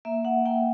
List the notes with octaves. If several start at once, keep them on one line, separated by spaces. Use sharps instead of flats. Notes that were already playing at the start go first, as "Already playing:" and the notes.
A#3 E5
F#5
A#3 G5